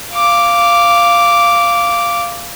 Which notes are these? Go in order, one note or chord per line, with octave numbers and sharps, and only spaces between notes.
F5 D6